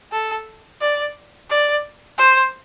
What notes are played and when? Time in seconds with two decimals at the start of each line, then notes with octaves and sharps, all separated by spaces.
0.12 A4
0.81 D5
1.50 D5
2.18 C5